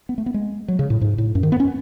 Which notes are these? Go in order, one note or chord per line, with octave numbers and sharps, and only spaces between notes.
B3
A3
B3
G#3
F#3
C#3
A2
G#2
A2
F#2
D#3
B3
C#4